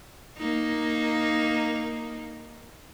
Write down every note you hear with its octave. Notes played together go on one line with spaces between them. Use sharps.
A#3 D#4